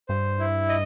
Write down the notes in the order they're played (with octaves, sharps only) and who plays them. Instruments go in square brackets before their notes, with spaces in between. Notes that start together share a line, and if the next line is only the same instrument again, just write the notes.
[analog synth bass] G2 [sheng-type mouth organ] C5
[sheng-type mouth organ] E4
D#5